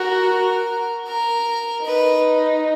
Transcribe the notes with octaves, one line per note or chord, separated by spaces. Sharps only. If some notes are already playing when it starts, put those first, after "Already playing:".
Already playing: F#4 A#4
A#4
D#4 B4